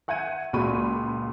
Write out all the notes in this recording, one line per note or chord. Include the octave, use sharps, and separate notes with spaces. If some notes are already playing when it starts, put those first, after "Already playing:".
E5 F#5 G6 G#6 D#7
C#2 A#2 F#4 B5 C#6 D#7